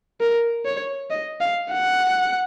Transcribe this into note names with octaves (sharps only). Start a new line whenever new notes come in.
A#4
C#5
D#5
F5
F#5